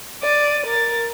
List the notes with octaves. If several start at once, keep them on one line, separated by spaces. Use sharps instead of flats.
D5 D#7
A#4 A6